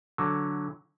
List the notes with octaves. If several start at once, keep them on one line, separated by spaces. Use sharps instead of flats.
D3 F#3